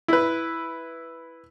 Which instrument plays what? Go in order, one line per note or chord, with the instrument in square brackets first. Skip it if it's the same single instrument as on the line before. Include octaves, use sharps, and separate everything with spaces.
[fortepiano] E4 B4